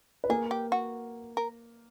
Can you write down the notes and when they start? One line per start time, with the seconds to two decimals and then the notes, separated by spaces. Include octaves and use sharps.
0.24 B4
0.29 A#3 G#4 A#4
0.51 G4
0.72 F#4
1.37 A#4